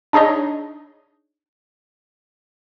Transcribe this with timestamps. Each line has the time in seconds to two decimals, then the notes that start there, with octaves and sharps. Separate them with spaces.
0.13 D4 D#4 G#4 C#5 D#5